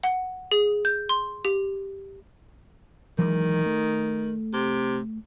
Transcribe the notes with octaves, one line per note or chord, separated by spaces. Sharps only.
F#5
G#4
G6
C6
G4
D#3 E3 F#3 G#3
A3
C3